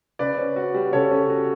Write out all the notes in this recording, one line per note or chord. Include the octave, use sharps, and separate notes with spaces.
C#3 B4 D5
C#4
F#4
G3
C#3 A4 C#5
C#4
F#4